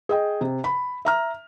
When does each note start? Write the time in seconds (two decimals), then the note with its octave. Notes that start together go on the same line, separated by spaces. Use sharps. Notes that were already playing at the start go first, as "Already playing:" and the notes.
0.09 G#4 D#5 G5
0.41 C3
0.64 B5
1.05 E5 A#5 F6